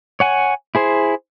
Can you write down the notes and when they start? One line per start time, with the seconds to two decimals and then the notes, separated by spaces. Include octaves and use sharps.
0.20 C#5 F#5 G#5
0.75 E4 G#4 C5